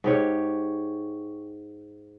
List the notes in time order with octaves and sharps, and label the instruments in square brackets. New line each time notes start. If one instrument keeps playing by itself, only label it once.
[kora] G#2 G4 C#5